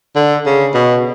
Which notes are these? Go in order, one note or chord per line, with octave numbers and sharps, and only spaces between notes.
D3
C#3
B2